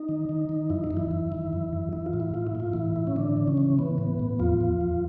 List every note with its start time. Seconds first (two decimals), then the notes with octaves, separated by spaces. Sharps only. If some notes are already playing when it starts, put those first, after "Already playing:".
Already playing: D#4
0.09 D#3
0.29 D#3
0.49 D#3
0.70 F#2 E4
0.84 D#4
0.91 F#2
0.97 E3 E4
1.11 F#2
1.32 D#3
1.53 F#2
1.73 F#2
1.93 E3 E4
2.06 F4
2.13 A2
2.20 E4
2.34 A2 F4
2.47 E4
2.55 A2 F4
2.73 A2 E3 E4
2.96 A2
3.07 C#4
3.16 D3 E3 D4
3.37 E3
3.48 C#3 C#4
3.57 E3
3.79 E3 B3
3.98 A2
4.19 A2
4.39 E2 F3 F4
4.61 E2
4.81 E2